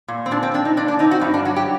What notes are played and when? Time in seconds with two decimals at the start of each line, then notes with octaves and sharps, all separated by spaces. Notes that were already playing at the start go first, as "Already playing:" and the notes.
0.08 A#2
0.26 C4
0.31 A#2 D4
0.43 C4
0.54 C4 D4
0.65 D#4
0.77 A#2 D4
0.88 D4
0.99 C4 D#4
1.11 F#4
1.21 G2 D#4
1.34 D4
1.45 F#3 F#4
1.56 G4